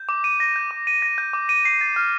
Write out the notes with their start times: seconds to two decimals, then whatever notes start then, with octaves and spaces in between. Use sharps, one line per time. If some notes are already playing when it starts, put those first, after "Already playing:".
Already playing: G6
0.09 D6
0.24 D#7
0.40 A#6
0.56 G6
0.71 D6
0.87 D#7
1.02 A#6
1.18 G6
1.33 D6
1.49 D#7
1.65 C7
1.81 A6
1.96 F6